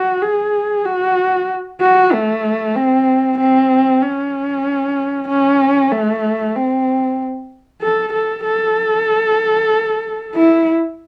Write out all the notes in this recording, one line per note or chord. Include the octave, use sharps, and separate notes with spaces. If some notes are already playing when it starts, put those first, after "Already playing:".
Already playing: F#4
G#4
F#4
F#4
A3
C4
C4
C#4
C#4
A3
C4
A4
A4
A4
E4